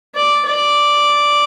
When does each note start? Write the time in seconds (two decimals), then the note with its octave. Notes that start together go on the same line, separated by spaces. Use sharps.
0.15 D5
0.47 D5